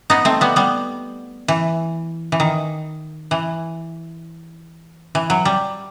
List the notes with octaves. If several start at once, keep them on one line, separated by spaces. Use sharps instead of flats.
B3 D#4
A3 C4
G3 B3
G3 B3
E3
E3
D#3
E3
E3
F#3
G3